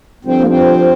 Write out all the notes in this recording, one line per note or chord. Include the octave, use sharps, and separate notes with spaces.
G2 D3 F3 C4
A#3
C4